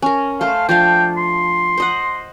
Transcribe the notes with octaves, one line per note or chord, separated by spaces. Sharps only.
C#4 A#4
A3 C5 F5
F3 D4 F5 G5
C6
C5 D#5 F#5